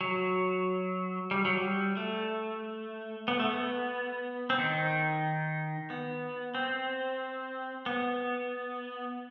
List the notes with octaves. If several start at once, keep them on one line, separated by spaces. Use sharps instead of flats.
F#3
G3
F#3
G3
A3
B3
A3
B3
C4
D#3 D#4
B3
C4
B3